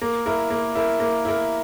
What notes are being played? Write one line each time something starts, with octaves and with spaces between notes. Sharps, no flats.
A#3
E4 A#4
A#3
E4 A#4
A#3
E4 A#4